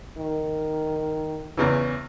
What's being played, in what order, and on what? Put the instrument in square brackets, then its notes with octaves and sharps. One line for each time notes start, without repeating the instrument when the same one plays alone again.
[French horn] D#3
[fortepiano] E2 C#3 E3